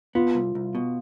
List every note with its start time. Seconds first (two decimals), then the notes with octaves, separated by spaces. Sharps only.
0.15 B3 F4
0.35 C2
0.55 C2
0.75 B2